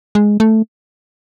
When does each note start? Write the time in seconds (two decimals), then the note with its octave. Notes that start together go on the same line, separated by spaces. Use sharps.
0.15 G#3
0.40 A3